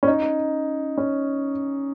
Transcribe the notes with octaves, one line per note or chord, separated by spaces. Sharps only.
C#4
D#4
C#4